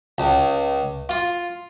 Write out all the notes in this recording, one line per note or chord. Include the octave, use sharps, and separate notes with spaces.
C#2
F4